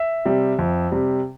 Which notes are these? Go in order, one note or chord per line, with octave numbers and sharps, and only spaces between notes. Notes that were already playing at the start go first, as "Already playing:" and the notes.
Already playing: E5
C3 G3
F2
C3 G3